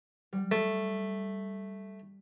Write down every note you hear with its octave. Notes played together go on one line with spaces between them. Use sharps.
G3
A3